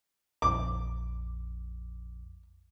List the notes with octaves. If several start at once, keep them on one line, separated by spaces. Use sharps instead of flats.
A#1 F2 D6